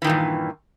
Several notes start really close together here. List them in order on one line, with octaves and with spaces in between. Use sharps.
E3 D#3 A#2 G2